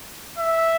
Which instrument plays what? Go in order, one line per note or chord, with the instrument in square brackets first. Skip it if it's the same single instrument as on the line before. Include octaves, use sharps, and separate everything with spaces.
[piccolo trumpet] E5